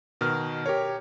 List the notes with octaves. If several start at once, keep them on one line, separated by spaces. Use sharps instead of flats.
B2 D#3 A#4 F6
G4 A#4 C#5